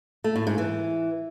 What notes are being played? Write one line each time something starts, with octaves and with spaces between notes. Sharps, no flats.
A3
A2
G#2
E3